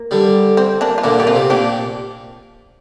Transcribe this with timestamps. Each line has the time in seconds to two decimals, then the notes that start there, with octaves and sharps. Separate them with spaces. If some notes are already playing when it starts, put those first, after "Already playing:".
Already playing: A#3
0.11 D3 G3
0.57 C4
0.81 A#3 D4
0.98 F4
1.03 A#2 D3 A#3 D4
1.19 A#2 G4
1.27 C4 F4
1.35 C3
1.50 A#2 D4 G4